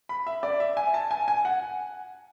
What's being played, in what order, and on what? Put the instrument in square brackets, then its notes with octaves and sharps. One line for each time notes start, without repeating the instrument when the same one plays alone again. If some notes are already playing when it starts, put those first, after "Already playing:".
[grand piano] B5
E5
D5
E5
G#5
A5
G#5
G#5
F#5